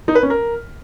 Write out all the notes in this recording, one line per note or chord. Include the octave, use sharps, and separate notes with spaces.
D#4
B4
C#4
A#4